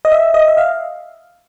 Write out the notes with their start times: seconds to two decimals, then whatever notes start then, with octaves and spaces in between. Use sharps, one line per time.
0.05 D#5
0.12 E5
0.34 D#5
0.48 E5
0.57 F5